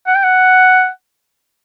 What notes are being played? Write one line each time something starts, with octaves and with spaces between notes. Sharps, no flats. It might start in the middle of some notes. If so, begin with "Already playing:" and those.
F#5
G5
F#5